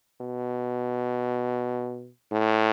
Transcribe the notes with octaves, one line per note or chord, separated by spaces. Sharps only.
B2
A2